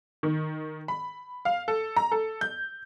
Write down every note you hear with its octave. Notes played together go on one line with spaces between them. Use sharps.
D#3
B5
F5
A4
A#5
A4
G6